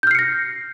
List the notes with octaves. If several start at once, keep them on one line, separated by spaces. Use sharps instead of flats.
F6 G6 A#6 C7 C#7